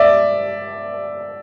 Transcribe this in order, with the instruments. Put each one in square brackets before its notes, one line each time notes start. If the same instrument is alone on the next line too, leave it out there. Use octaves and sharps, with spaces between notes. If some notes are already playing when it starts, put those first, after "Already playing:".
Already playing: [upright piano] D5 E5